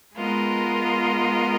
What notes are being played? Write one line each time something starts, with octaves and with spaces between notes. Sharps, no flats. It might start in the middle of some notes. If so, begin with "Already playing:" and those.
G#3 B3 F4 A#4 D#5